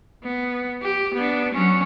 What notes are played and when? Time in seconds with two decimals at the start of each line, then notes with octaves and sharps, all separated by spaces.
0.23 B3
0.83 G4
1.14 B3 D4
1.53 F#3 C#4